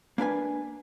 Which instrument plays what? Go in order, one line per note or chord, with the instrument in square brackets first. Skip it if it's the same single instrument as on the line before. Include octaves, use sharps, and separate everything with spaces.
[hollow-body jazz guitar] A#3 D4 B4 G#5